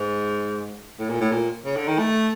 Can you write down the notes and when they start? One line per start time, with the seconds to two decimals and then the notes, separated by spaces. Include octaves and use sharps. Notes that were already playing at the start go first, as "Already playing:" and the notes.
Already playing: G#2
0.99 A2
1.10 A#2
1.21 A2
1.32 A#2
1.66 C#3
1.77 D3
1.88 D#3
1.99 A3